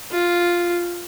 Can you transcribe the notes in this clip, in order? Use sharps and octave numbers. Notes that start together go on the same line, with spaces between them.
F4